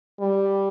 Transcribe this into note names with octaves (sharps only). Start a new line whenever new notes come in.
G3